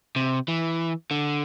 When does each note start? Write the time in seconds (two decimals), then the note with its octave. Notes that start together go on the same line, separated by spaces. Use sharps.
0.16 C3
0.48 E3
1.11 D3